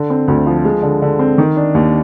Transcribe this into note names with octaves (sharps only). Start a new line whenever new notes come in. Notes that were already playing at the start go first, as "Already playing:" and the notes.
Already playing: D3
C4
D2
F3
G#3
D3
D3
C4
D#3
D4
D#2